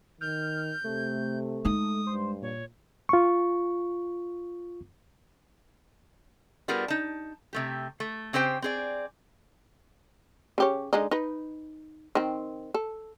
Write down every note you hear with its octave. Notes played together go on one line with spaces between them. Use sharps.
D#3 F6 G6
C3 A3
G#3 D#4 D#6
G2 C5
A#2 C#5
F4 C#6
G3 B3 F4 G#4 A#4
D#4 A5
C3 A3 G4
A3
C#3 C4 G4 C5 G5
C4 G#4 D5
C#3 G4 C#5
D3 G#3 D#4
D#4 B4
D#3 C4
A4